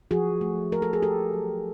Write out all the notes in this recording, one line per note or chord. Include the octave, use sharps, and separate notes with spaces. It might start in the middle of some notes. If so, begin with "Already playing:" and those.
F3 F#4 G#4
A3
A3 A#4
A4
G#4
A3 G4 A4
F#3